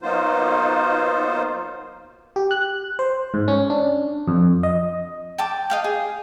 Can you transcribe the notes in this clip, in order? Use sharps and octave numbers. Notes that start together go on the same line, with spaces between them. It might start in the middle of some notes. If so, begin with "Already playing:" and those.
F#3 A#3 B3 D#4 F4 C5
G4
F#6
C5
G#2
C#4
D4
F2
D#5
G5 A5 D6
D#5 F5 G5
G#4